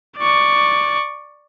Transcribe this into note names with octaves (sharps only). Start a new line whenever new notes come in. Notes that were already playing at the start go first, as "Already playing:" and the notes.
D5 C#6